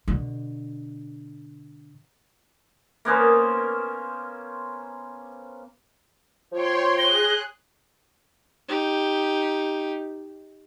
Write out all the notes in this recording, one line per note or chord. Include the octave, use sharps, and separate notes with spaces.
B2 D3
A#3 B3 C#4 C5
F3 C#5 G5 C6
G#4 F#6 A#6 G7
D#4 G4